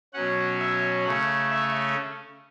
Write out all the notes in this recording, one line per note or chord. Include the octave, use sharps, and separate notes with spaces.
B2 F#3 C#4 F#5
E5
C#3 A3 C#4 F#5
E5